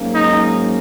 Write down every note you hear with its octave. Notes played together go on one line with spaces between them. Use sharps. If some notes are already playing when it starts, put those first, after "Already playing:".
Already playing: G#2 F#3 A#3 C#4
D#4